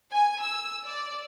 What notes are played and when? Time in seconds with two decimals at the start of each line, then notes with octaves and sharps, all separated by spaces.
0.12 G#5
0.43 E6
0.85 D5